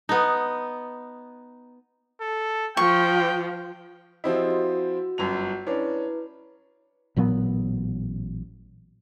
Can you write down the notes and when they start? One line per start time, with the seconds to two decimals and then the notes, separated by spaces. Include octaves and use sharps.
0.09 B3 D#4
2.21 A4
2.77 F3 G5 C#6
4.24 F3 C4 E4 F#4 G4 D#5
4.50 F#4
5.18 G1 F#2 F7
5.67 C#4 D4 E4 B4
7.16 A1 A#2 F#3 B3